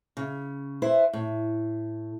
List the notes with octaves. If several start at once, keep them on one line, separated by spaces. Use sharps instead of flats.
C#3
E4 B4 C5
A2